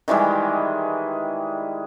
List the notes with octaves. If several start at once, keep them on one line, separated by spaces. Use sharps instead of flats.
D#3 E3 G3 G#3